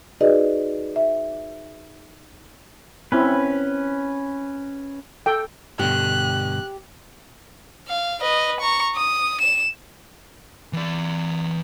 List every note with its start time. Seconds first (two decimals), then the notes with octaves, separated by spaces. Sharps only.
0.21 D#4 F#4 G#4 B4 D5 D#5
0.96 E5
3.12 C4 C#4 E4 B4
5.26 A4 G5
5.79 G2 B2 D3 G4 F#6
7.88 F5
8.20 B4 D#5
8.61 A#5 C#6
8.96 D#6
9.41 E7
10.73 E3 D5